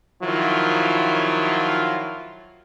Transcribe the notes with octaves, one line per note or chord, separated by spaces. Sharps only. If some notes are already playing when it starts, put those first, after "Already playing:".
D#3 F3 F#3 E4 F4